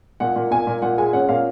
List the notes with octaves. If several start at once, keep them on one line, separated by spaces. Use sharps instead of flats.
A#2 F#5
A#2
A#2 G#5
A#2
A#2 F#5
G#3 G#5
C#4 F#5
A#2 F5